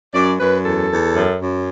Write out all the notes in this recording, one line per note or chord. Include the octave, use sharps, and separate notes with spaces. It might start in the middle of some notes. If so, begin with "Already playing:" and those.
F#2 D5
F#2 B4
E2 A4
E2
F#2
F#2